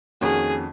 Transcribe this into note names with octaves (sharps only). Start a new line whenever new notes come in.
F2 D#3 A#3 C#4 F#4 G#4